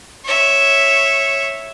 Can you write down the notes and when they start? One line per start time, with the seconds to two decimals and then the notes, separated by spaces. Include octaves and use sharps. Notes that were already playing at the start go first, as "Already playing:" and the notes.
0.24 C#5 E5